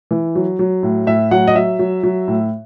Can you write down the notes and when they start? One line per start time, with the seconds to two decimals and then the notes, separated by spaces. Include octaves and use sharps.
0.11 E3
0.35 F#3
0.59 F#3
0.83 A2
1.07 A2 E5
1.31 F#3 F#5
1.48 D#5
1.55 F#3 E5
1.79 F#3
2.03 F#3
2.28 A2